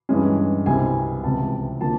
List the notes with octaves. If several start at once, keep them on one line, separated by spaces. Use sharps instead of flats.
G2 E3 G#3 C#4
C2 B2 G3 C4 G#5
C#2 C3 E3 A5
D3 F3 A#3 A5